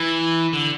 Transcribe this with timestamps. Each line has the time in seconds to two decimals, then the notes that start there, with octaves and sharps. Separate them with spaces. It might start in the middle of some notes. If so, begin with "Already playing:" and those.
Already playing: E3
0.53 D3